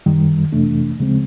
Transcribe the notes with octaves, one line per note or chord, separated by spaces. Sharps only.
F#2 D#3 G3
F2 C3 E3 A3 D4
D2 C#3 F3 G#3 C4